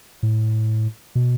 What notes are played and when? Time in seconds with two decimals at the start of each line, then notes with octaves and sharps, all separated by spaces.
0.23 A2
1.15 B2